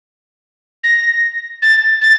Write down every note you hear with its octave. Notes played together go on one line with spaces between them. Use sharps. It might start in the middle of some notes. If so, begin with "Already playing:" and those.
A#6
A6
A6